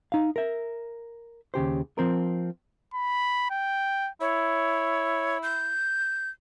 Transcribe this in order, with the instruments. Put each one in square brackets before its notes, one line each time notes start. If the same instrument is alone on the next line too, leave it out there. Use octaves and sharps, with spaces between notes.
[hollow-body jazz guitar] D#4 F5
A#4 E5
D#2 C#3 G4 C5
F3 C4 A#4
[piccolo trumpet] B5
G5
[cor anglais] E4 [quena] C#5
[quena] G6